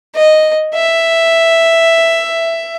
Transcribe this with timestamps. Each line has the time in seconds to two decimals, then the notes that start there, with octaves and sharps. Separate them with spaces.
0.15 D#5
0.75 E5